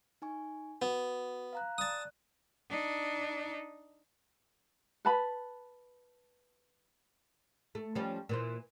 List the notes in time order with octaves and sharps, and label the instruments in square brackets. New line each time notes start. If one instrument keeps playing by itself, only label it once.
[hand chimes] D#4 G#5 C#6
[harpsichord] B3 [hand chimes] F#4
[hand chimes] F5 A#5 F#6
[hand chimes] D5 F#6 [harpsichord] A5 D#6
[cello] D4 D#4
[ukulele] B4 A5 B5
[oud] A3
F3 G3 C#4
A#2 E3 C5